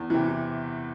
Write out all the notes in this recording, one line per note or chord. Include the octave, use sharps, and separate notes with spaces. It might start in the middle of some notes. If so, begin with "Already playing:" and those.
Already playing: E2
C3 E3